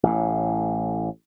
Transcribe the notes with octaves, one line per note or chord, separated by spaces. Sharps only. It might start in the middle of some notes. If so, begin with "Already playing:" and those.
A1 A2